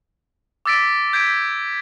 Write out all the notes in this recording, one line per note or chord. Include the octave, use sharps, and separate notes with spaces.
D6 E6 A6 B6 D7
G6 G#6 B6 D7